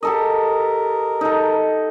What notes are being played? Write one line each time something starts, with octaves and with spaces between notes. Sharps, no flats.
G4 A4 A#4 D#5
D#4 A4